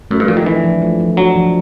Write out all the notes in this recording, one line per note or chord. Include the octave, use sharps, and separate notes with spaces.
F#2 A3
G2
A#2 F3
D#3
E3 D4
F3
A3
F3
F#3 D4
F3